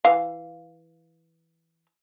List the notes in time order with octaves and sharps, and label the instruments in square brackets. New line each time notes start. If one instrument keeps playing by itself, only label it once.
[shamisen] E3 F5